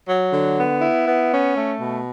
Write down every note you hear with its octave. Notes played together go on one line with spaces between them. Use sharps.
F#3
D3
B3
E4
B3
C#4
A3
B2